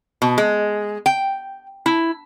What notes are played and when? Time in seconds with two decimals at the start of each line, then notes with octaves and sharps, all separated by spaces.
0.22 B2
0.38 G#3
1.06 G5
1.86 E4